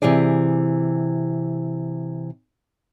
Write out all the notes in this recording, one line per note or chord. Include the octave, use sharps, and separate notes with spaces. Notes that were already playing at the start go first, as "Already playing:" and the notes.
C3 E3 G4 G#4 D5